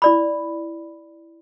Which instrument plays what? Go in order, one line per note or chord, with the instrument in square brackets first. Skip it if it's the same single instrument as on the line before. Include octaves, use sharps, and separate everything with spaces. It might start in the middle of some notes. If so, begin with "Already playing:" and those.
[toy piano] E4 D5 B5